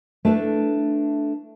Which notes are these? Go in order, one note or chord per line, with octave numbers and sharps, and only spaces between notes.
A3 D4 E4 A4 B4